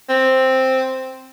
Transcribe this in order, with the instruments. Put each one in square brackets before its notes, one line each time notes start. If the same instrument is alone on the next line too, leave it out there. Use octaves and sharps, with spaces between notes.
[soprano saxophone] C4